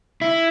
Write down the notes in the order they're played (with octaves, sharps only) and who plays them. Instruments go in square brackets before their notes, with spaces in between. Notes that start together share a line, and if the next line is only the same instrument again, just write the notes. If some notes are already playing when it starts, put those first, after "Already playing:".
[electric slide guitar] E4